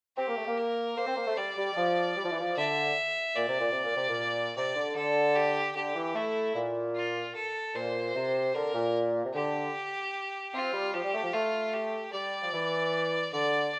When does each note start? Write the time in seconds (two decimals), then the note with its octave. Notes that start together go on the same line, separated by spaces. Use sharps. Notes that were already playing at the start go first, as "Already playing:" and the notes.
0.17 C4 G4
0.28 A#3
0.37 A3
0.48 A#3
0.57 A#4
0.97 A#3 C5
1.07 C4
1.17 A#3
1.27 A3
1.37 G3 D5
1.57 G3
1.73 G3
1.77 F3
2.17 G3
2.25 F3
2.32 E3
2.40 F3
2.57 D3 E5
3.36 A#2 D5
3.48 C3
3.60 A#2
3.72 C3
3.84 A#2
3.97 C3
4.09 A#2
4.56 C3 D5
4.76 D3
4.95 D3 A4
5.35 G4
5.75 D3 G4
5.95 E3
6.15 A3 E4
6.55 A#2
6.95 F4
7.35 A4
7.75 A#2 C5
8.15 C3
8.54 D3 A#4
8.74 A#2
9.25 C3
9.34 D3 G4
10.54 C4 F4
10.73 G3
10.93 F3 G4
11.03 G3
11.14 A3
11.23 F3
11.33 A3 F4
11.74 G4
12.13 G3 D5
12.43 F3
12.53 E3
13.33 D3 D5